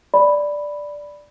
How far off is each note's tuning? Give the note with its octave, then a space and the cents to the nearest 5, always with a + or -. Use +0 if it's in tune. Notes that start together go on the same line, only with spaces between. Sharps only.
D5 +0 B5 +0